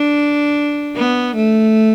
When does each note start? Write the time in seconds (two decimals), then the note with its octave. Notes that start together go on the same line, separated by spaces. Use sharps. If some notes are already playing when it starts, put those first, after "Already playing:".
Already playing: D4
0.96 B3
1.36 A3